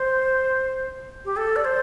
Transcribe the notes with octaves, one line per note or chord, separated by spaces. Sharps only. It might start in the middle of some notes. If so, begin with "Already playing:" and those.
Already playing: C5
G4
A4
D5
C5